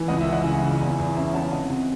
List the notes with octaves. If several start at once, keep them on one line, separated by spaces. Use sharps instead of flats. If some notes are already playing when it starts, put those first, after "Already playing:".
Already playing: E3
C#2 D#5 F#5
E5
E3
D#5 F#5
C#3 E5 G#5
C#3
E2
E2
C#4 E5 G#5
C#4 F#5 A5
C3 D#5 F#5
C3